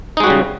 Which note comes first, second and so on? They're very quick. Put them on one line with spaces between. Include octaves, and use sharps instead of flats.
D#4 G#3 F#4 G3 C#3